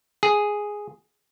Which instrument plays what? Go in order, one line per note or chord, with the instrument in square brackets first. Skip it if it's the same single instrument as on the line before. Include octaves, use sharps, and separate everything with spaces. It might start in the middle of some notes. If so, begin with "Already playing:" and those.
[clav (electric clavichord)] G#4